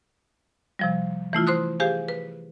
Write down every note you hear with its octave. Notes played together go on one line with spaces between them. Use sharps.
C3 F3 G3
E3 A3 E4 F4
C5 C6 D#6 F#6
G4 G#4 C5 F5 G#5
B4